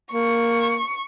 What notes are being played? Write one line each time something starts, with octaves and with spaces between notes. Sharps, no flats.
A#3 C#6